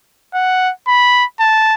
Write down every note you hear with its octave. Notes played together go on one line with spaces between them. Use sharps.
F#5
B5
A5